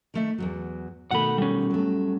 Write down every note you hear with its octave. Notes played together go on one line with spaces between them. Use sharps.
D#3 A3 E5
E2 G2 F#3
B2 D#3 A3 F#5 B5
G3 C#4
F#3 A3